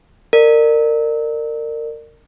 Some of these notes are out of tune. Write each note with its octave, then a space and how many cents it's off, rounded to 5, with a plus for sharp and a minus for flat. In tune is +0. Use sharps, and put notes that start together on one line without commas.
A#4 -25 D5 +35